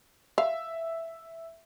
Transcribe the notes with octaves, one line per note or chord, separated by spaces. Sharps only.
E5 F5